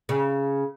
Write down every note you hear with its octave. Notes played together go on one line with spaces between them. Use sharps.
C#3